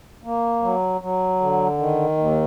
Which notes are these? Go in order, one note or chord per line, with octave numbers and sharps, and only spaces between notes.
A#3
F#3
F#3
D3
D#3
D#2